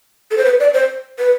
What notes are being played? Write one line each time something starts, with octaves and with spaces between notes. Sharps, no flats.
A4
C5
B4
D5
C5
B4